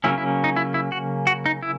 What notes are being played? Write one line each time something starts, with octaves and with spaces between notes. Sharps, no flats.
C#3 F#3 A#3 C#4 E4
E4
D#4
E4
E4
F#4
F#4
D#4
E4